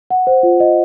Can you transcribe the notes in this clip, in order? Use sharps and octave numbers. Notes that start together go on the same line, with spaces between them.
F#5
C5
F4
D#5